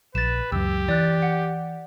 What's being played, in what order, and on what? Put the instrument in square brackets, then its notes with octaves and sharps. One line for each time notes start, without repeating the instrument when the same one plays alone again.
[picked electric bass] A#1 [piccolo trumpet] B4 [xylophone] A6 E7
[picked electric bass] C#2 F#2 [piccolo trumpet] G4 [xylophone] E6
[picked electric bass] E3 [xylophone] D5 F#6 A6
[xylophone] F#5